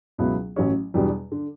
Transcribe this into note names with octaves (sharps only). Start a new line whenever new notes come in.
C#2 B2 F#3 B3 E4
A1 A2 F#3 C#4
E2 B2 G3 D4 G4
D3